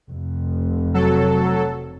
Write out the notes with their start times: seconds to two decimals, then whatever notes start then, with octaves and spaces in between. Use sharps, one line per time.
0.11 F1 F2
0.94 F#3 A4